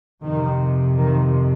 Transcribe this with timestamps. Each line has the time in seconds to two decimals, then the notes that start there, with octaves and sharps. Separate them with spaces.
0.22 F2 C3 D#3
0.97 D#3